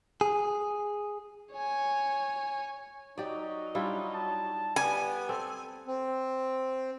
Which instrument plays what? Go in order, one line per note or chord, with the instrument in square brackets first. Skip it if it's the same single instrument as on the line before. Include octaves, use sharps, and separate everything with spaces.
[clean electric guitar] G#4
[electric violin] C#5 G#5
[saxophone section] F#3 D#4 [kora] G4 D5
[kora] G3 E4 F4 [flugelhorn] D4
[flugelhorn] A5
[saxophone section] B3 G4 [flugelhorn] D5 [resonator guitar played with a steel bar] G#5
[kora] C4 [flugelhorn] A4
[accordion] C4